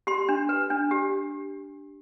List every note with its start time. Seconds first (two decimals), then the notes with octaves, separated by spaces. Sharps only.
0.07 G4 C6
0.29 D4
0.49 B4
0.70 D4
0.91 G4